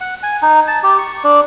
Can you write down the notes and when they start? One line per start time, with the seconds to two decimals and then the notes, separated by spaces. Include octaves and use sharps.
0.01 F#5
0.23 G#5
0.42 D#4
0.68 A5
0.83 G4
0.99 C#6
1.24 D4